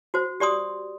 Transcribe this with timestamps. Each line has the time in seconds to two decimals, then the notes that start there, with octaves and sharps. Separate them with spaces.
0.14 F#4 C5
0.40 G4 D5 C6 D#6